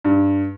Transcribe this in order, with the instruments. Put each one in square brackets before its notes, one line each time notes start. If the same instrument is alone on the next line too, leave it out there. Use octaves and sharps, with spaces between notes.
[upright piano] G2